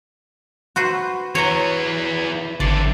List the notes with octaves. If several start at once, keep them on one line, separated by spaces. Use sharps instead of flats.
F#4 B4 C5
E3 B3 C#5 A#5
G#1 D3 E3 D5